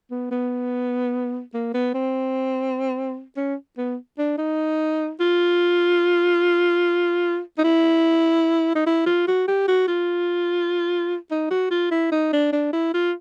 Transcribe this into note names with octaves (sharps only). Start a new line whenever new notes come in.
B3
B3
A#3
B3
C4
C#4
B3
D4
D#4
F4
D#4
E4
D#4
E4
F4
F#4
G4
F#4
F4
D#4
F#4
F4
E4
D#4
D4
D4
E4
F4